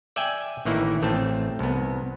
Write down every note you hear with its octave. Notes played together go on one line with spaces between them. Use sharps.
D5 E5 G5 G#5
A1 D#3 E3 A#3 D#4 E4
A1 A3 C4 A5
C2 B3